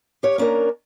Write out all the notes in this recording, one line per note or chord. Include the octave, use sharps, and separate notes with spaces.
G4 C#5
A#3 C#4 D4 A#4